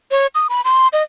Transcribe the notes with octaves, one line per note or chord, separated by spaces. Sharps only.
C#5
D#6
B5
C6
D#5